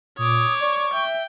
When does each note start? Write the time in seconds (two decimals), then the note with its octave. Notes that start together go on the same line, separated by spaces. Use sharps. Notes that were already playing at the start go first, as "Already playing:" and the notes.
0.18 A#2 C#5 D6 D#6
0.61 D5 C#6
0.93 E5 G5